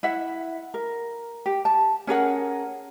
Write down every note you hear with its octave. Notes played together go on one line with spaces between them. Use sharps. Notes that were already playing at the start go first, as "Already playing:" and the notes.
E4 E5 F#5
A#4
G4
A5
C#4 G#4 A#4 F#5